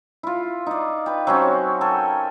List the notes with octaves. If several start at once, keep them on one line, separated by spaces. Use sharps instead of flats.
E4 F4
D#4 D5
B4 G5
F#3 C4 C#4
A4 A#4 G5 G#5